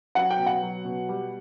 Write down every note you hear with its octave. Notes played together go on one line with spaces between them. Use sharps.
F#3 F#5
G5
B2
F#5
F#3
B2
G3